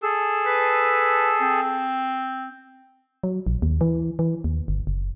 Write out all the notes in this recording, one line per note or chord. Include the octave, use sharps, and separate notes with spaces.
G#4 A4 E6
B4
C4
F#3
A#1
D#2
E3
E3
D#2
G1
F#1